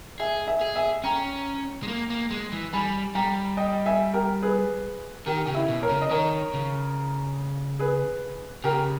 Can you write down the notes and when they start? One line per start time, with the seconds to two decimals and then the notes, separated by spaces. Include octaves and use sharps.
0.20 G#4 E5 G#5
0.47 E5 G#5
0.61 G#4
0.76 E5 G#5
1.04 C#4 G5 A#5
1.83 G#3
1.88 A#3
2.10 A#3
2.31 G#3
2.52 E3
2.73 G3 G#5 B5
3.15 G3 G5 A#5
3.57 D#5 G5
3.86 E5 G#5
4.14 G4 A#4
4.43 G#4 B4
5.26 D#3 G4 A#4
5.45 C#3 G4
5.55 E4
5.69 B2
5.82 A#4 C#5
5.90 C#3
6.02 D#5
6.11 D#3 A#4 C#5
6.53 C#3
7.79 G#4 B4
8.64 C#3 G4 A#4